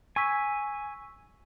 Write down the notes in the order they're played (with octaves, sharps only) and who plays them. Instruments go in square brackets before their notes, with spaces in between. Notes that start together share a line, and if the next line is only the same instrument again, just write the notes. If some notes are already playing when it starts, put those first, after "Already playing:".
[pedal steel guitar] G#5 [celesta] C#6 E6 B6